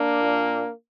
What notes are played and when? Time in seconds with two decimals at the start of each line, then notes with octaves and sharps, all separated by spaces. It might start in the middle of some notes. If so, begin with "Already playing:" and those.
Already playing: A#3 D4
0.21 A#2